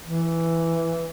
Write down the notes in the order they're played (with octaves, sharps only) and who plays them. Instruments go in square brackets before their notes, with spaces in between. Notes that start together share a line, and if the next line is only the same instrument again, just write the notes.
[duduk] E3